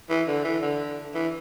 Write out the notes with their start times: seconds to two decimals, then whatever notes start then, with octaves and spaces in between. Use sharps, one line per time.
0.10 E3
0.27 D3
0.45 E3
0.62 D3
1.15 E3